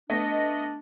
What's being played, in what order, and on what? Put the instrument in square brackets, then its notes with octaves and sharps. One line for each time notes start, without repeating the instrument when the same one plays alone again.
[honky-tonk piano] A3 B3 [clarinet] D4 [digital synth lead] D#5